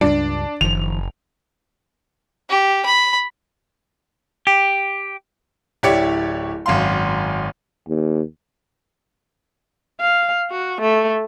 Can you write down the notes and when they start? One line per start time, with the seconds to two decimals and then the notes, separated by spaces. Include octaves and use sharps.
0.01 C#2 G2 G3 D4
0.61 F#1 D#3 F3 F7
2.49 G4
2.85 B5
4.47 G4
5.83 D1 E4 G4 C#5 D5 C#7
6.66 G#1 F#2 F5 C6
7.89 D#2
10.00 F5
10.51 F#4
10.81 A3